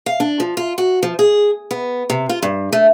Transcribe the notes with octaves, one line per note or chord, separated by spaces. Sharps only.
F5
D4
F3
F4
F#4
F3
G#4
B3
C3
F4
G2
A3